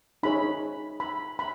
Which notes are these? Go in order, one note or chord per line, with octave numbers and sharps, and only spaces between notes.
D#4 G#4 C#5 B5
B5
B5